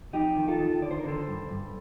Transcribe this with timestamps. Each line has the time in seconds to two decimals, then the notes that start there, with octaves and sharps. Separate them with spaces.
0.13 F2 D#4 G4
0.36 D#3
0.48 F4 A4
0.59 D#3
0.82 D3 D5
0.91 C5
0.99 A#4
1.05 D3 A4 C5
1.28 G2
1.50 G2